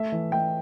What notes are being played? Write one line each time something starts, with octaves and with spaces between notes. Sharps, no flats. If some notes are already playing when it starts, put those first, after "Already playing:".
Already playing: A3 E5
E3
A3 G5